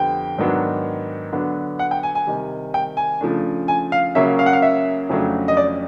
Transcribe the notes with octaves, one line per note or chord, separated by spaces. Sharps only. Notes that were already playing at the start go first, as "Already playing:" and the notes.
Already playing: F2 D3 G3 B3 G5
G#2 D#3 F#3 B3 D4
D3 F#3 B3 D4
F#5
G5
G#5
G#5
C3 D#3 G3
G5
G#5
C#3 F3 A3 D4
G#5
F5
C#3 F#3 A#3 C#4 E5
F5
F#5
F5
E5
F2 C#3 F#3 A3 D4
D#5
D5